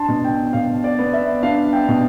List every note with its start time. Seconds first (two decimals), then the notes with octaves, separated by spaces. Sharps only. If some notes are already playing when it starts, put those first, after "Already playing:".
Already playing: D4 A5 C6
0.08 B2
0.24 G5
0.53 B2 F5
0.84 D5
0.99 B3
1.13 E5
1.43 D4 F5
1.73 G5
1.88 B2